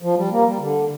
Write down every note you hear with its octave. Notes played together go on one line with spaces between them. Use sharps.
F3
G3
A#3
G3
D3